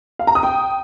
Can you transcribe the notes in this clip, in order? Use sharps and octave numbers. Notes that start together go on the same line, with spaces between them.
F5
A#5
D#6
G5